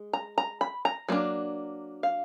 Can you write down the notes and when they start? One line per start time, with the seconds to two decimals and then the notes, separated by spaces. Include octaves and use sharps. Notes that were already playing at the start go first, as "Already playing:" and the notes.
Already playing: G#3
0.13 A#5
0.38 A#5
0.61 B5
0.85 A#5
1.09 F#3 A#3 D4
2.03 F5